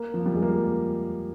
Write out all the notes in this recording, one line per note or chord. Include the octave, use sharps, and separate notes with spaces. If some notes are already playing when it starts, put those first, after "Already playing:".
Already playing: A#3
F3
G3
G#3
A#3